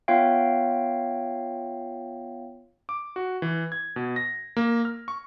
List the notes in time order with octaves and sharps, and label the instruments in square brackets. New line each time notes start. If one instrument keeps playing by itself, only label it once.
[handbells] B3 F4 C#5 E5 F5 G5
[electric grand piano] D6
F#4
E3
G#6
B2
A#6
A#3
F6
C#6